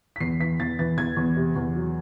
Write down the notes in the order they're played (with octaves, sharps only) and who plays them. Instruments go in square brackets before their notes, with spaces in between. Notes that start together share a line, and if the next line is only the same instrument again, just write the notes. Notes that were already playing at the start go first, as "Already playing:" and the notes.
[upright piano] B6
E2 C7
E3 B6
E2 A6
E3 A6
E2 G#6
E2
C3
E2
F#3